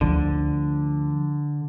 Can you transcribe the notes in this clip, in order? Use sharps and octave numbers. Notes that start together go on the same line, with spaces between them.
D2 D3 F3